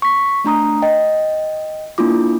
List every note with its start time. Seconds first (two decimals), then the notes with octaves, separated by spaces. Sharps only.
0.02 C#6 B6
0.44 A3 D4 A#5 D#6
0.82 D#5 G5
1.98 A#3 D4 E4 F4 D6